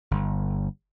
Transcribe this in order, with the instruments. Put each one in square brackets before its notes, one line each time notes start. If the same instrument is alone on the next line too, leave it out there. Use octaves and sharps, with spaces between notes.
[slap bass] G1